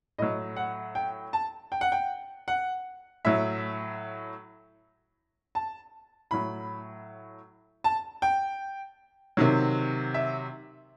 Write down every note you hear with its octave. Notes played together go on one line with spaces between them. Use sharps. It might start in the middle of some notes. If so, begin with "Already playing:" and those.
A2 F#3 D#5
F#5
G5
A5
G5
F#5
G5
F#5
A2 F#3 E5
A5
A2 F#3 B5
A5
G5
C3 D#3 F#3
E5